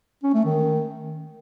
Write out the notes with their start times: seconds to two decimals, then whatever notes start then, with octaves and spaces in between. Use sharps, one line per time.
0.23 C#4
0.34 A3
0.45 D#3